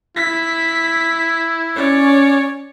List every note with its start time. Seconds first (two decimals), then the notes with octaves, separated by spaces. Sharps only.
0.17 E4 B6
1.75 C#4 C#5 D5